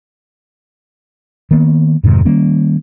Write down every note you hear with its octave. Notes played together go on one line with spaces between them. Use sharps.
D#3 A#3 B3
F2 G#2 C3 D#3
D#3 G3 A#3 C#4